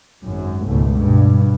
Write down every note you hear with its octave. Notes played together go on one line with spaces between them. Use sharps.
G#1 F#2
C#2 G#2 B2 A3
G2 B2